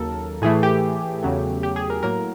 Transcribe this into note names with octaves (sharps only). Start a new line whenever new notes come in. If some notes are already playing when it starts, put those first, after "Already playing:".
Already playing: D#2 C#3 F#3 A#3 A4 A#4
A2 E3 A3 G#4
G4
E2 C#3 F#3 A3
G4
G#4
A#4
A2 F#3 A#3 A#4